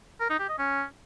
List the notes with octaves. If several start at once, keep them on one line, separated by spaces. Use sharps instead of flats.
A#4
D#4
G4
D#5
C#4